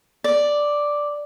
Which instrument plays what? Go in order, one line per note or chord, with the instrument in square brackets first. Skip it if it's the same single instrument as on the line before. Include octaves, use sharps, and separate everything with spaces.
[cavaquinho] D5